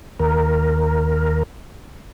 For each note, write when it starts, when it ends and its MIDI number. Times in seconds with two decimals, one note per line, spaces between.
0.20 1.43 39
0.20 1.43 70